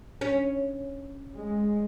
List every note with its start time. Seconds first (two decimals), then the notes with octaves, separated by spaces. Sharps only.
0.21 C#4
1.36 G#3